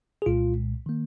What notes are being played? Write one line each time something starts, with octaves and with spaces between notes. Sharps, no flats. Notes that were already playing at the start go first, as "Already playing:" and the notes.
G#4
C2 A#2 G#3 F4
D#3 A#3